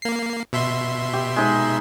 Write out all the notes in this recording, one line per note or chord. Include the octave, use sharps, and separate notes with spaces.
A#3 C7
B2 E5 C6
G4
G#3 D#4 B5